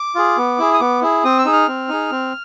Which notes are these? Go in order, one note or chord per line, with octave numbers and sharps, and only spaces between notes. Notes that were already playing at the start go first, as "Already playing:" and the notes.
Already playing: D6
F4 G#4
B3
E4 G#4
D#6
B3 D6
E4 G#4
C4 D#6
E6
D#4 G#4
F6
C4
D#4 G#4
C4